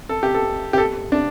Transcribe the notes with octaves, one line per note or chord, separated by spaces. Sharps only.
A4
G4
A4
G4
A4
D4